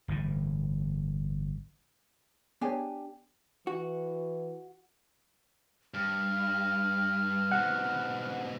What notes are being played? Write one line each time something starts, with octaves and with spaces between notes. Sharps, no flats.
G1 A2 E3
B3 D4 G4 G#4 C#5 G#5
E3 F#4
G2 F6
G#2 B2 F#5